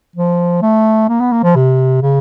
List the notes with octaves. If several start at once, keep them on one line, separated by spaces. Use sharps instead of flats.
F3
A3
A#3
B3
A#3
F3
C3
C#3